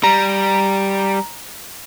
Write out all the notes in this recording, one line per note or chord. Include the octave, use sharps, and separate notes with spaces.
G3 A#5